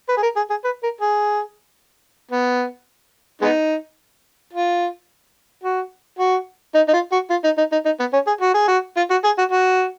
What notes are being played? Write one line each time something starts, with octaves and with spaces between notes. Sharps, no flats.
B4
G#4
A#4
G#4
G#4
B4
A#4
G#4
B3
G#3 B3 D#4
F4
F#4
F#4
D#4
D#4
F4
F#4
F4
D#4
D#4
D#4
D#4
B3
C#4
G#4
F#4
G#4
F#4
F4
F#4
G#4
F#4
F#4